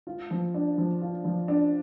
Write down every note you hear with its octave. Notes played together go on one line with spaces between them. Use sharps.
F4
F3
D4
F3
F4
F3
D4